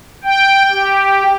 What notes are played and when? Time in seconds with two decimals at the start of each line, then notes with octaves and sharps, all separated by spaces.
0.24 G5
0.70 G4